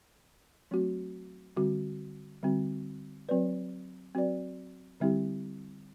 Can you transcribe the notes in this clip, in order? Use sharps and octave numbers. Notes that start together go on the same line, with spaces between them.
F#3 A3 C4 F#4
D3 G3 C4 F#4
D3 G3 C4 F#4
F#3 C4 F#4 B4 D5
F#3 C4 F#4 B4 D5
D3 G3 C4 E4 G4